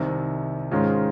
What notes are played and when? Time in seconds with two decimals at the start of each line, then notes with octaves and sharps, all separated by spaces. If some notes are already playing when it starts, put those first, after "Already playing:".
Already playing: C2 C3 D#3
0.71 G#2 D#3 G#3 C#4 F4